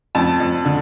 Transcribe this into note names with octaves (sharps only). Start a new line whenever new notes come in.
F2 A5
F2
D3